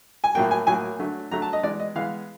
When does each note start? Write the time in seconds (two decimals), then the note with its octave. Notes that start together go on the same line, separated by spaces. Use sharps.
0.24 G#5
0.35 A2 F#3 A#3 G5
0.51 G#5
0.67 A2 F#3 A#3 G#5
0.99 D3 F#3 A3
1.31 D3 F#3 A3 A#5
1.42 A5
1.53 D#5
1.63 E3 G#3 B3 D5
1.80 D#5
1.96 E3 G#3 B3 F5